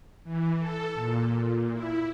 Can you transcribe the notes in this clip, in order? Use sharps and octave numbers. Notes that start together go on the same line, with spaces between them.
E3
A4
A#2
E4